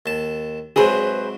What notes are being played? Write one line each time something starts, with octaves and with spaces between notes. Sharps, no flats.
D#2 A5
G#2 C3 F#3 G#4 B4 C5